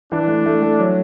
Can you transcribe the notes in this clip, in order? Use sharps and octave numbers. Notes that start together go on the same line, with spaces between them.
E3 D4
A3
A3
A3
F#3